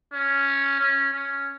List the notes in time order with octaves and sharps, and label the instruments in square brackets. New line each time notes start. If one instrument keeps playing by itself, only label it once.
[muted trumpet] C#4
C#4
C#4